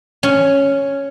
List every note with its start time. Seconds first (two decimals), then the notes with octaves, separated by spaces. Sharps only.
0.23 C#4